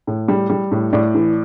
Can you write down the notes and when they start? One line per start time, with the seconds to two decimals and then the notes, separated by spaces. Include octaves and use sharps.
0.07 A2
0.28 G3
0.50 G3
0.71 A2
0.93 A2 D5
1.15 E3